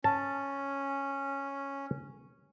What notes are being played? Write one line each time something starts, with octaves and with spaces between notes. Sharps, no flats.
C#4 A5